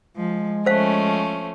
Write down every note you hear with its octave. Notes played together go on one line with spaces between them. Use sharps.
F3 G#3
F3 A3 C#4 C5 F5